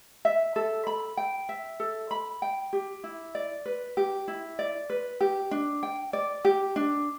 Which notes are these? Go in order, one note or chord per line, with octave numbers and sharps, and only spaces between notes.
E5
A4
B5
G5
E5
A4
B5
G5
G4
E4
D5
B4
G4
E4
D5
B4
G4
D4
G5
D5
G4
D4